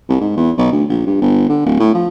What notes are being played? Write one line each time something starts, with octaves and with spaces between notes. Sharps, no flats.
C2
G#2
E2
B1
D2
A#1
G2
G1
D3
D1
A2
F3